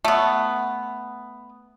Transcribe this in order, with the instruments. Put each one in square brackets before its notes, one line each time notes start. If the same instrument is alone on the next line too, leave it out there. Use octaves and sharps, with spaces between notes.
[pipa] A3 B3